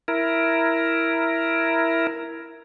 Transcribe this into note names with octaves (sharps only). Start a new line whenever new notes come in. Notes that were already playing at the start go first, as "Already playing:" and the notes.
E4 A#4